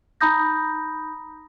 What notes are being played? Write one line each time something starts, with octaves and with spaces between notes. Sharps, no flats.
D#4 A#5 B5 D#6 G6 A#6